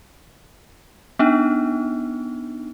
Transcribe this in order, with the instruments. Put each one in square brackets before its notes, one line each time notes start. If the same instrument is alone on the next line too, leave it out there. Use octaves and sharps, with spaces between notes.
[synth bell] B3 D4 D#4